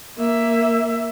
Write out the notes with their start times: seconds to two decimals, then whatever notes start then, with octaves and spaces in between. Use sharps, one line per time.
0.18 A#3 E5